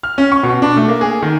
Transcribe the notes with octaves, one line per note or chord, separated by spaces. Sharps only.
F6
C#4
C#6
B2
D4
A3
A#3
G#4
D#3